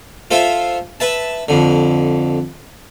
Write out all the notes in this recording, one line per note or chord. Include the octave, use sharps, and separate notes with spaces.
F4 A4 C5 E5
B4 E5 A5
F2 D3